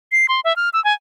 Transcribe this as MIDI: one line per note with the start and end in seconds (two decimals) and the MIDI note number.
0.12 0.26 96
0.29 0.40 84
0.45 0.55 76
0.56 0.69 89
0.73 0.83 88
0.84 0.93 80